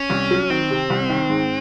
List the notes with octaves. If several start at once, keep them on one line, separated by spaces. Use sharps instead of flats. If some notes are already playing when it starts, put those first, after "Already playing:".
Already playing: C#4
C2
F#3
D#3 C4
C3
C2
D#3
G#2